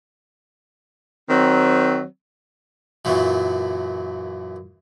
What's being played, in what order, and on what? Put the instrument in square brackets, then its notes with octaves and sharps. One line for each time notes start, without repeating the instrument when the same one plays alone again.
[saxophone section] D#3 F#3 C4
[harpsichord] F#2 A#2 E3 F#3